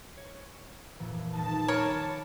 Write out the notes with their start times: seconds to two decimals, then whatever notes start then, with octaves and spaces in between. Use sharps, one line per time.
0.17 C#5
0.99 F2 A#2 E3
1.35 D#1 D#4 A5
1.68 A#4 C#5 G#5 B5 D6